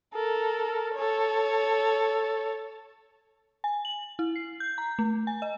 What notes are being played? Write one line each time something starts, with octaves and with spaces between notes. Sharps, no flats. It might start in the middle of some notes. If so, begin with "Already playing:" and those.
A4 A#4
A4 C#5
G#5
F#7
E4
C7
G6
A#5
A3
G#5
D#5